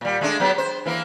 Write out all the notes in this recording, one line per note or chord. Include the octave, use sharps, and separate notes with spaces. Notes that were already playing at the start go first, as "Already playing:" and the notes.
A#2 G3
G#3 A3 D4
F#3 B3 G4
C5
E3 A#3 E4